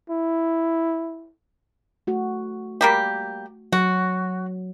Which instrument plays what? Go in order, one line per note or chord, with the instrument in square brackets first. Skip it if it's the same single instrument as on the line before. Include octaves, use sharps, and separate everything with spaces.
[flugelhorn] E4
[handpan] A3 F#4
[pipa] G3 A#3 G4
[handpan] F#3 [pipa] F#4